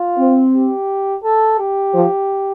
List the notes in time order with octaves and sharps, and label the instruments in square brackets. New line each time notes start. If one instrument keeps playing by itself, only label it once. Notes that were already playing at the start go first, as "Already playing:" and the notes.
Already playing: [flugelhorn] F4
[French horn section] C4
[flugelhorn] G4
A4
G4
[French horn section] F3